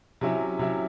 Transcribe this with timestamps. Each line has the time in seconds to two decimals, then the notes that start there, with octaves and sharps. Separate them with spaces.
0.21 C3 F#3 C#4 E4
0.59 C3 F#3 C#4 E4